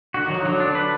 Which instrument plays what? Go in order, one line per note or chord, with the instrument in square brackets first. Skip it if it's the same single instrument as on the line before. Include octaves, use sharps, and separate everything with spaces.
[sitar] D3 [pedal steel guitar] F#4
[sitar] D#3
[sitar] F3 [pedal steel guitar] F#3
[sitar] D3 [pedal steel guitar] F#3
[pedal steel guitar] D4
B4